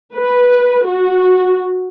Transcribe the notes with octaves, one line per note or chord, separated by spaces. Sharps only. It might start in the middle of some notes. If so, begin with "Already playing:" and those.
B4
F#4